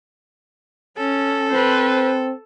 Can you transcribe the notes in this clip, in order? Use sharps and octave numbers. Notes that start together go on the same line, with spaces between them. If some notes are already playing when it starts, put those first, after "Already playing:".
C#4 A4
C4 B4 C5